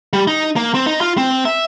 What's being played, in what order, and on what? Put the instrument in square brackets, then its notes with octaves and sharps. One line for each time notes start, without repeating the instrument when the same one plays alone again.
[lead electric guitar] G3
D#4
A#3
C4
D#4
F4
C4
E5